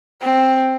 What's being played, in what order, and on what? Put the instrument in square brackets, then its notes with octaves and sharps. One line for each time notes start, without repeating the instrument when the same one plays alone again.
[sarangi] C4